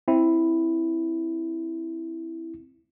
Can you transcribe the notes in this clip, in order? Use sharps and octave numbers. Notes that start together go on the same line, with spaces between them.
C4 E4